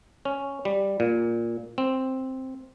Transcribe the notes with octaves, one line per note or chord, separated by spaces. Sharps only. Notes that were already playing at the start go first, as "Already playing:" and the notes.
C#4
G3
A#2
C4